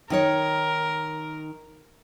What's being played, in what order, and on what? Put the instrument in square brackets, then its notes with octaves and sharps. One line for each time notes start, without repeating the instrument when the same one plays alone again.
[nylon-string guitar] D#3 D#4 C#5 [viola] A#4